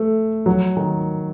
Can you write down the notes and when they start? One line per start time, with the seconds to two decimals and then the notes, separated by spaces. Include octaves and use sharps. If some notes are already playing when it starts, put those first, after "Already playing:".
Already playing: A3
0.46 F#3
0.77 D#3